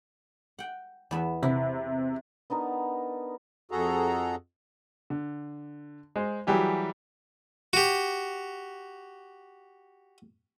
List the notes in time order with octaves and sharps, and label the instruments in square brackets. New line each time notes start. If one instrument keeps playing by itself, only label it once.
[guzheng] F#5 G5
E2 B3 E5
[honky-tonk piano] C3 [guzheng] E4
[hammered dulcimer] B3 D4 D#4 A#4
[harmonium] F2 F#4 G#4 A4 A#5
[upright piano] D3
G#3 C5
E3 F#3 G3 G4 G#4
[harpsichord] F#4 G4